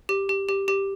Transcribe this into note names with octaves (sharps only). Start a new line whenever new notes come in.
G4
G4
G4
G4